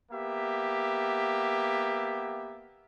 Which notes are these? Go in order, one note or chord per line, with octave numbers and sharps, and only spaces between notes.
A#3 B3 G4 E5